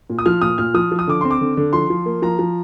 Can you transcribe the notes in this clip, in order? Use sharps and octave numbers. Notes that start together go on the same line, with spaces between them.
A#2
D#6
F3 F6
A#2 D#6
A#2 F6
F3 D#6
F3
D#6
D3 D6
C4 C6
D6
D3
D3
F3 C6
F3
A#3
F3 A#5
F3